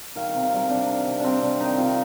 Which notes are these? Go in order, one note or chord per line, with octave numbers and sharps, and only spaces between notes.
D#3 F5
F5
C3
F5
G3 A#4
C3 D4
D#3
C3
G3 C4 D4
C3 D4
D#3 D#4
C3 F4